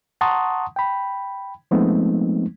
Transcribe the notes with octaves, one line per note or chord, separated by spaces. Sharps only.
F#5 A5 A#5 C6 C#6 D#6
G5 B5
F3 G#3 A3 B3 C4 D#4